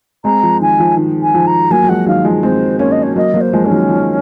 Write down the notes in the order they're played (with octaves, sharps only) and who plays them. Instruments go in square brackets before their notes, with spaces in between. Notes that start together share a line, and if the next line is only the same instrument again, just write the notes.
[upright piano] G#3 C4 [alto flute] A#5
[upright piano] F3
[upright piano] D#3 [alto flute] G#5
[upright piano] F3
D#3
[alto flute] G#5
[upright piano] F3
[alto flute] A#5
[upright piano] F#3 A#3 [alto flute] G#5
[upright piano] F#3
[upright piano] F3 G#3 [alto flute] F#5
[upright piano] D#3 F#3 [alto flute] F5
[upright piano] F3 G#3
[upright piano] G#3 C4 [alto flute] C5
[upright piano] A#3 C#4 [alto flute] C#5
[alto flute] D#5
C#5
[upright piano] F#3 A#3 [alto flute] D#5
[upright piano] F#3 A#3
[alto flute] C5
[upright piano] F3 G#3
[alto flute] C#4
[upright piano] D#3 F#3
F3